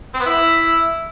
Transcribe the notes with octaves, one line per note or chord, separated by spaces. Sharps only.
C4
B3
E4